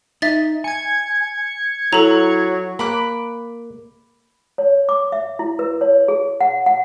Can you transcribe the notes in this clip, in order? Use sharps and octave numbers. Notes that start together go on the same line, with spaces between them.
D#4 E5 A6
G#5 G#6 C#7
F#3 E4 A4 A#5
A#3 B5 D6 F#6
C#5
D6
E5
E4
B4
C#5
G#4
F#5
F#5